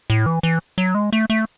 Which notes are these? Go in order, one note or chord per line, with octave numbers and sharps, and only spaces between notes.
A2
E3
E3
F#3
G#3
A3
A3